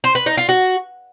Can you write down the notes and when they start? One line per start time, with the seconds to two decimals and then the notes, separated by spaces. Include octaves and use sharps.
0.04 C5
0.15 B4
0.26 D#4
0.37 F4
0.49 F#4